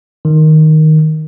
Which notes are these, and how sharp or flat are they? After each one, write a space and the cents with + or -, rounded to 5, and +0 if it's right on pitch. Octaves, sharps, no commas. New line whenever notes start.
D#3 +0